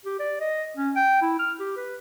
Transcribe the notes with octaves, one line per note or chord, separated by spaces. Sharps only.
G4
D5
D#5
C#4
G5
E4
F6
G4
B4